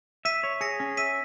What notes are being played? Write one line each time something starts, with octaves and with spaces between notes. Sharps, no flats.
E5 B6 D#7
C#5
G#4 A#6 C#7
C#4
E5 B6 D#7